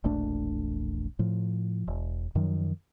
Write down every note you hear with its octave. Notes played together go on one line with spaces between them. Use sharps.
E1 A#1 A3 D4
A2 F3
E1
F#2 D#3 F3 F#3